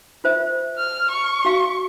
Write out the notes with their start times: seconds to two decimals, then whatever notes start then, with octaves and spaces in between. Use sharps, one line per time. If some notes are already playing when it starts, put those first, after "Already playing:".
0.24 F4 C5 E5
0.78 F6
1.11 C#6
1.45 F#4 F5